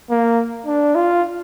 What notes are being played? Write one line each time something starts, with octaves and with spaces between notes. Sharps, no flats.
A#3
D4
F4